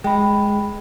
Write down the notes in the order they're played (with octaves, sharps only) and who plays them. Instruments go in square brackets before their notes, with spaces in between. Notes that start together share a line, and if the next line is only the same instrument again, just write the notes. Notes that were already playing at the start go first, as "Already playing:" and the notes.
[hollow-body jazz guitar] G#3 [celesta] G5 B5